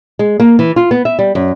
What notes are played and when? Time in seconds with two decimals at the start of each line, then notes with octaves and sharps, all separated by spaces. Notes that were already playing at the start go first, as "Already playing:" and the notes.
0.19 G#3
0.40 A#3
0.59 E3
0.76 F4
0.91 B3
1.05 E5
1.19 G3
1.35 F#2